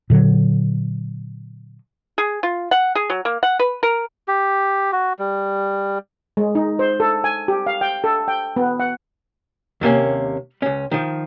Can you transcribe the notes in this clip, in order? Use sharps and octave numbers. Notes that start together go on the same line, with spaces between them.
A#2 D3 F#3
G#4
F4
F#5
G#4
F#3
A#3
F#5
B4
A#4
G4
F#4
G3
G#3
D#4
C5
A4
G#5
G4
F5
G5
A4
G5
B3
F#5
D#2 C3 A#3 C#4
C#2 C#4
D#3 F3